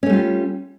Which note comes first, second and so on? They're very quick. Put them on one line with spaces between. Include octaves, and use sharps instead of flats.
C#4 A3 G3 F4